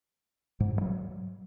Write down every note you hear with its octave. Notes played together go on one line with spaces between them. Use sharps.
G#2
G2
F#3